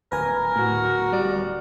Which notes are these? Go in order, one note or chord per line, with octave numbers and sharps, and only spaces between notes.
D1 A#4 B4 G#5
A2 F#4
G3 D5